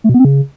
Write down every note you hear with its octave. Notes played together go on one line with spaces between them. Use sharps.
A3
B2
B3
C4
C#3